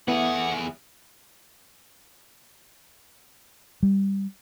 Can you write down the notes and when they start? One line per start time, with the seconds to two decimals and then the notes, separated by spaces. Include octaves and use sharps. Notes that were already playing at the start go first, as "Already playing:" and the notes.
0.08 E2 A3 B3 E4 G#4 E5 F#5
3.83 G3